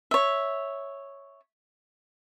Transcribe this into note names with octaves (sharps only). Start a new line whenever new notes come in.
C#5 E5